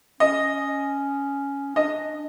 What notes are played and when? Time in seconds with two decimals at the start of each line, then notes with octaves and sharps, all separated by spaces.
0.20 C#4 D#5
1.76 D4 D#5